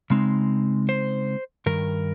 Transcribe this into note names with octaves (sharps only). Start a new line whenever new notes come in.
C#3 G#3 C4 D#4
C5
G2 D#3 A#4